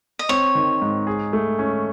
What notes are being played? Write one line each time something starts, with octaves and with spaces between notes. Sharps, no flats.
D#5
C4 C#5
D#3
G#2
G#4
A3
C#4